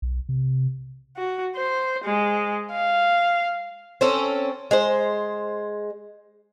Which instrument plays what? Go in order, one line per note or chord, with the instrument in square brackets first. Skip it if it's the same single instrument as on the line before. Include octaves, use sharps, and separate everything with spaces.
[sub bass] B1
C3
[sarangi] F#4
C5
G#3
F5
[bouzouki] C4 C#4 A4
G#3 C5